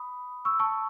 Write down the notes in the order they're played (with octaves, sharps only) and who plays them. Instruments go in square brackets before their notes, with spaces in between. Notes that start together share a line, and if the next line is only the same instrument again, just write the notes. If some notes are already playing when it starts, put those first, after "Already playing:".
Already playing: [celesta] B5 D#6
C#6 E6
A5 C#6